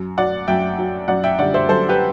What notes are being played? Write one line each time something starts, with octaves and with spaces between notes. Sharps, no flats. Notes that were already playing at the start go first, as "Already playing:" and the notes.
Already playing: F#2
F#3 D5 F#5
F#2 E5 G5
F#3
F#2 D5 F#5
E5 G5
D3 G3 D5 F#5
C5 E5
F#2 A4 C5
G4 B4